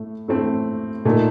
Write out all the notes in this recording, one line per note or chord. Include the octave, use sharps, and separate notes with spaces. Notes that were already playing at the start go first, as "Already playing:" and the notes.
Already playing: A2 A3
A2 A3 C4
A#2 A3 D#4